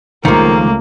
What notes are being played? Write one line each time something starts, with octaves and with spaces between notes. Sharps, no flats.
C#2 D#3 F3 A3 A#3